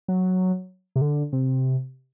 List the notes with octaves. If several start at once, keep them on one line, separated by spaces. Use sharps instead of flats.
F#3
C3
D3
C3